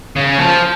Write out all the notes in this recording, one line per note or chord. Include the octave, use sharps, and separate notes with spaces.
C#3
F3